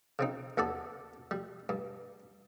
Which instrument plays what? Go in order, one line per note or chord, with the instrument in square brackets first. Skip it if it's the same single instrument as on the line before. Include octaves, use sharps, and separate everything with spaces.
[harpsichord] C#3 C4 D#4
D#2 B3 A4 D5
G3
G2